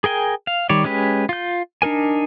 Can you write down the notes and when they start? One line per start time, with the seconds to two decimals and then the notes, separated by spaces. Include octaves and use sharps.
0.04 G#4 A#4 G5 G#5
0.47 F5
0.69 D#3 G3 C#5 D5
0.84 G#3 C#4 G4 B4
1.29 F4 G6
1.82 D4 D#4 A#4 G#5